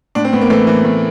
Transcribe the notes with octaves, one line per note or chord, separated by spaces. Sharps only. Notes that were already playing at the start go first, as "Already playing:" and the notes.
A2 D4
C4
A2 B3
A#3
E3 A3
E3
A2